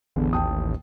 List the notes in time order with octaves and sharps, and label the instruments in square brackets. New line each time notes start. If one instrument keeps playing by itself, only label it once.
[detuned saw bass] A1 [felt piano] E2 [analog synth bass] D3
[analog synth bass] D#2 [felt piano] G5 A5 D#6